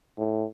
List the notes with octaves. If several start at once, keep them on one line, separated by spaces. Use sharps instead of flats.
A2